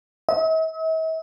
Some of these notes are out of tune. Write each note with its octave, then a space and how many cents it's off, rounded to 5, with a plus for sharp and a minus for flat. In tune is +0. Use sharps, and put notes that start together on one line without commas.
E5 -45